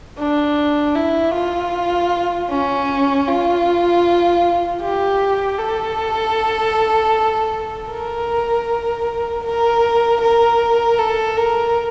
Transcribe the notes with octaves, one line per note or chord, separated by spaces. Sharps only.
D4
E4
F4
C#4
F4
G4
A4
A#4
A#4
A#4
A4
A#4